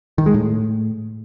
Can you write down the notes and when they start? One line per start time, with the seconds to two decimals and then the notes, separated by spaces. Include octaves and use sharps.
0.18 D#3
0.26 G#3
0.34 A2